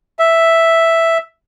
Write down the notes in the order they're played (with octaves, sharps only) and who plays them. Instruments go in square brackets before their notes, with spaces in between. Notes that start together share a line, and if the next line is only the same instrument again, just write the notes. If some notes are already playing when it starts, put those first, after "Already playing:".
[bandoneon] E5